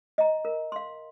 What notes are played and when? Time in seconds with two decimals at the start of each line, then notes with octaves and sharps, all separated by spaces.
0.18 D#5 A#5
0.45 A#4
0.72 F5 C6